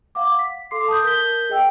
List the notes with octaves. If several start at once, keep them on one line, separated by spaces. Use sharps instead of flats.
F5 F#5 D6
B6
A4 F5 C6 D6 C7
A5 D#6 G6
A#4 G6 B6 G7
G#4 D#5 G5 E6